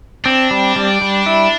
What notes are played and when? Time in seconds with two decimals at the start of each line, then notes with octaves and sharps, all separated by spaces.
0.25 C4 D4
0.51 G3
0.76 G3
1.02 G3
1.26 E4